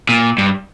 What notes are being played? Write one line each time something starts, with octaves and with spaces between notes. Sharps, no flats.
A#2
G2